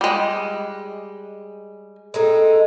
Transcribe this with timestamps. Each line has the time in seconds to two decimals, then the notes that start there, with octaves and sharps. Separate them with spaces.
0.01 G3 G#3
2.14 G#3 C4 D#4 A4